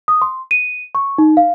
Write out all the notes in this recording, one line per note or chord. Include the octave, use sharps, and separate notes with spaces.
D#6
C6
D#7
C#6
D#4
F5